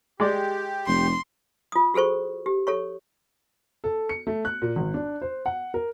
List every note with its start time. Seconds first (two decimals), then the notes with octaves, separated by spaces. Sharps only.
0.20 G#3 G4 D5
0.87 F1 C6
1.72 F4 D#6
1.94 F#4 G#4 A4 C5 C#6
2.46 G4
2.67 A4 C#5 C#6
3.84 A4
4.09 C#7
4.27 A3
4.45 F#6
4.62 A#2
4.76 G#1
4.94 D4
5.22 C5
5.46 F#5
5.74 A#4